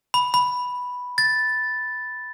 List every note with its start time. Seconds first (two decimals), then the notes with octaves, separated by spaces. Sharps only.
0.14 B5
0.34 B5
1.18 A6